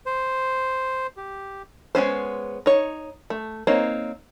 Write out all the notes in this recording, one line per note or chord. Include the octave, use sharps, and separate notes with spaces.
C5
G4
G#3 B3 C#4 C5
D#4 C#5
A3
A#3 C4 D#4 C#5